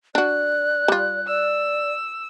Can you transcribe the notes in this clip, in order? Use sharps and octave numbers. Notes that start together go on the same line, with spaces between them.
D4 F#4 D5 F#6
G3 F4
D5 E6